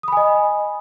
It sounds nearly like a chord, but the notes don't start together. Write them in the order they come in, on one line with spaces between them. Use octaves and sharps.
D#6 B5 G#5 D#5